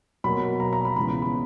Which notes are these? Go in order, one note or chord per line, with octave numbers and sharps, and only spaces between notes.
B2 F#3 A#3 B5
A#5
A#5
B5
C#2 C#3 E3 B3 B5
B5